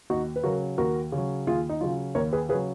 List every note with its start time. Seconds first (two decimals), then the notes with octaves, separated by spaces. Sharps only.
0.10 D#2 D#4 F#4
0.36 B4
0.44 C#3 F#3 F#4 A#4
0.78 D#2 F#4 A#4
1.12 C#3
1.18 F#3
1.47 D#2 F4 G#4
1.69 D#4
1.81 C#3 F#3 F4
2.15 D#2 A#4 C#5
2.33 G#4 B4
2.49 C#3 G#4 B4
2.54 F#3